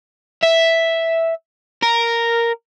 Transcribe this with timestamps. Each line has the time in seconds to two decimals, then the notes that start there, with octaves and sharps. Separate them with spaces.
0.43 E5
1.83 A#4